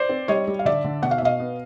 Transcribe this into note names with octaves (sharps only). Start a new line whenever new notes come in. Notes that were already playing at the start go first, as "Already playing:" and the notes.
Already playing: C5 D5
C4
G3 C#5 D#5
G3
F5
D3 D5 E5
D3
B2 F#5
F5
E5
B2 D#5 F5
B3